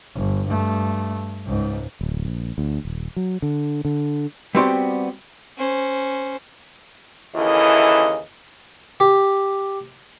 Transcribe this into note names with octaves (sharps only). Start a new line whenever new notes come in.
G1
G2 A3
C#2 G#2
D1
A#1
D2
D#1
F#3
D3
D3
G3 B3 C4 F#4 G4 D5
C#4 C5
D#2 C#3 E3 E4 A4 D#5
G4